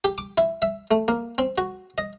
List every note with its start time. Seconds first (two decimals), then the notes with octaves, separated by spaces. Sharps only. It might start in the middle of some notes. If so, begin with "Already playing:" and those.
0.04 G4
0.18 D6
0.38 E4
0.62 E5
0.91 A3
1.08 A#3
1.38 C4
1.58 F#4
1.98 D#5